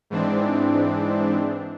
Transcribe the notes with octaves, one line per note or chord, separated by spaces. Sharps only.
G#2 E3 C4 D4